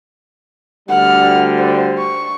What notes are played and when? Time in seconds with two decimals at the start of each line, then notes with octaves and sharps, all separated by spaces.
0.89 D2 D3 G3 F#5 F6
1.58 C5
1.98 C#6